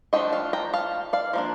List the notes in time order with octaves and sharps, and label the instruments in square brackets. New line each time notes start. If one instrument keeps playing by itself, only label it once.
[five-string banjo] F3 A3 D4 D#5 G5
F5 A5
G5 A#5
F5 A5
D5 F5
F3 A#3 D4